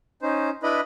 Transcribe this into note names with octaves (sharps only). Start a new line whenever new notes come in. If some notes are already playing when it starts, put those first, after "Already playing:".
C#4 D#4 C5
D4 E4 B4 D#5 B5